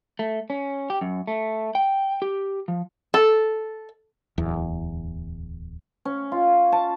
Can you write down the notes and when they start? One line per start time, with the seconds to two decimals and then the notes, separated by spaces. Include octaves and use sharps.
0.19 A3
0.50 C#4
0.90 G4
1.01 F#2
1.27 A3
1.75 G5
2.22 G4
2.68 F3
3.14 A4
4.38 D1 E2
6.05 C#4
6.32 F4
6.72 A5